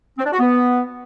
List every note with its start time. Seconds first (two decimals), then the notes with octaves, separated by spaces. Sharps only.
0.19 C4
0.26 D4
0.33 F#4
0.40 B3